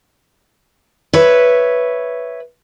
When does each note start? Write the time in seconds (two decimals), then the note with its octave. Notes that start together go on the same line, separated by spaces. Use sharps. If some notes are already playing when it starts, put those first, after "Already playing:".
1.13 B4 C#5 E5